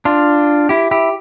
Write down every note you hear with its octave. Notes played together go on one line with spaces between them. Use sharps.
D4 F4
E4 G4
E4 G4